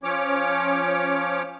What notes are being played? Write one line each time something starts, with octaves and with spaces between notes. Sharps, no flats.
F3 C#4 C#5 D6